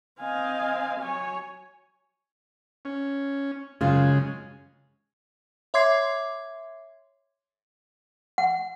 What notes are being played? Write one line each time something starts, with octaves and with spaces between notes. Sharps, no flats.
C4 D#5 F5 G#5
F#3 C#5 G#5
C#4
F#2 C#3 G#3 F4
C#5 E5 C6 D6 G#6 C7
F#5